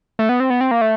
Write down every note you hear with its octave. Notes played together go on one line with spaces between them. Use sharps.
A3
B3
C4
B3
C4
A#3
A3